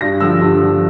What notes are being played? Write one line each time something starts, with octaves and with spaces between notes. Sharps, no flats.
G2 A#6
D3 F3 E6
G2
D3 F3